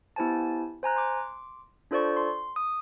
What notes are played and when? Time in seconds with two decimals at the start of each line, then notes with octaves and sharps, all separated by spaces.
0.16 B3 E4 G4 C5 G#5 A5
0.83 C5 G#5 A#5 F#6
0.96 C6 D6
1.91 D4 F4 A4 C5 D5 C#6
2.17 C6
2.56 D#6